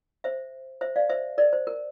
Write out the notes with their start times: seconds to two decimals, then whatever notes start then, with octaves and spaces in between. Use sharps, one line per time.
0.24 C5 E5
0.81 C5 E5
0.96 D5 F5
1.09 C5 E5
1.38 A#4 D5
1.53 C5
1.67 A#4